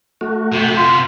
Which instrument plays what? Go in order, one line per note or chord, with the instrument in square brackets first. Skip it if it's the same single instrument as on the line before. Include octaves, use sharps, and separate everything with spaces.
[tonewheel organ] A3 F#4
[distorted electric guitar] C3 B3
[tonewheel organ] F4 [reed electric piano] C6